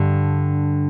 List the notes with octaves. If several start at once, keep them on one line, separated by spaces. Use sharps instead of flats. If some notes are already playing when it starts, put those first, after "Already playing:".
Already playing: G2 D3